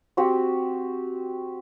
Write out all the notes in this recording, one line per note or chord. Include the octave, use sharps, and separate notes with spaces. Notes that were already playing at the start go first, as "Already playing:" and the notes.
C4 F#4 G4